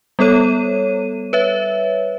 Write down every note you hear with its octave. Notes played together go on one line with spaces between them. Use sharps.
G3 B3 A4 C#5 D#7
B4 C#5 E5